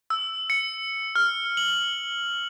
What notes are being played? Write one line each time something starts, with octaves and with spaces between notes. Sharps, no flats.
E6
C#7
F6
F#7